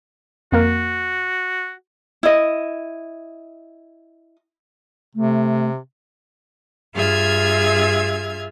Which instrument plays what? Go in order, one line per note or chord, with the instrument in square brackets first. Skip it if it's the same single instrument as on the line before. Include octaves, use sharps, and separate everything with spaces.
[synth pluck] F2 A#3 A#4 [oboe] F#4
[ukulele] E4 D#5
[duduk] C3 [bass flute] A3
[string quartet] G2 F4 G#4 E5 F6 G#6